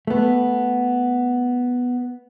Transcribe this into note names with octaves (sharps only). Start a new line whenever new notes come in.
A3 B3